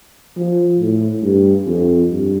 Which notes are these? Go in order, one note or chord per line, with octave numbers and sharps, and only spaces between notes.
F3
A2
G2
F2
G2